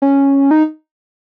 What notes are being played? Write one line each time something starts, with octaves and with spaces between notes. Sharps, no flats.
C#4
D#4